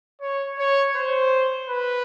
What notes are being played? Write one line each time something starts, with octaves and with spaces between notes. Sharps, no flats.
C#5
C#5
C5
B4